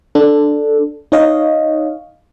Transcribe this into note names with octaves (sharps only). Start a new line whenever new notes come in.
D4 A4
D#4 C#5 D#5 F5